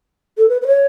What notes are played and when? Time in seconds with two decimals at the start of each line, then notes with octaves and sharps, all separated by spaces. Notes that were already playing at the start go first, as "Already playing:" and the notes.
0.38 A4
0.49 B4
0.62 B4
0.67 C#5